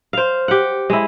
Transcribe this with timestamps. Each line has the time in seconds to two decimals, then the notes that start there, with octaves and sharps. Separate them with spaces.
0.13 C5 F5
0.48 G4 F#5
0.90 G#3 E4